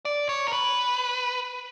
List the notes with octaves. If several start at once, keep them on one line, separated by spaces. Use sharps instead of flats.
D5
C#5
A#4
B4